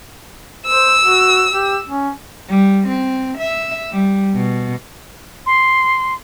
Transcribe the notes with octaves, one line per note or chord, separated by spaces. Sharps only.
C5 E6
F#4
G4
C#4
G3
C4
E5
G3
B2
C6